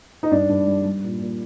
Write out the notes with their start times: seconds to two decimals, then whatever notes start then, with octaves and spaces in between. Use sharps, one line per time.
0.23 D#4
0.31 G2 D4
0.49 G2
0.67 G3
0.85 G3
1.03 A#2
1.20 A#2